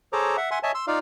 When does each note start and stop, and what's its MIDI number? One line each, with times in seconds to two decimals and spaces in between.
0.13 0.37 68
0.13 0.37 69
0.13 0.37 72
0.13 0.37 73
0.13 0.37 82
0.13 0.37 86
0.37 0.50 76
0.37 0.50 78
0.51 0.59 76
0.51 0.59 78
0.51 0.59 80
0.51 0.59 84
0.63 0.72 73
0.63 0.72 75
0.63 0.72 76
0.63 0.72 80
0.63 0.72 81
0.75 0.86 84
0.75 0.86 88
0.87 0.99 63
0.87 0.99 65
0.87 0.99 74
0.87 0.99 77